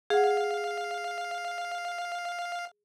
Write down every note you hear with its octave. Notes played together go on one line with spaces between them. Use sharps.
G#4 F5 F#5